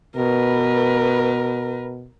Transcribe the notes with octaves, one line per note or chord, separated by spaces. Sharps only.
B2 A#4 B4